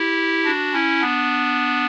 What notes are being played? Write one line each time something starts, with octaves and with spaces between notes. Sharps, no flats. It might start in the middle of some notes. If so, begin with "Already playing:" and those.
Already playing: E4 G4
D4 F#4
C#4 E4
B3 D4